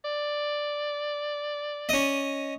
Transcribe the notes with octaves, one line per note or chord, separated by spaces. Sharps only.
D5
C#4 D#5